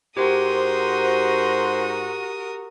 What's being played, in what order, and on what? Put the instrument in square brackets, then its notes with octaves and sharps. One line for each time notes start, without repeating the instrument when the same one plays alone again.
[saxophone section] G#2 C5 [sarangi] F#4 [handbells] G4 [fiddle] A#4 D#6